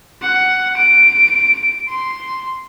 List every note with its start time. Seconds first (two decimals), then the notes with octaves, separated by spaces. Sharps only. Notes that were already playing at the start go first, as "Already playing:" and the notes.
0.22 F#5
0.77 D7
1.88 C6